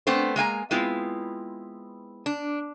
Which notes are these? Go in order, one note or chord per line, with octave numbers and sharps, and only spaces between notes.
A3 B3 C4 D4 C5
G#3 A#3 G#5 A#5
G#3 B3 C4 E4 F4
D4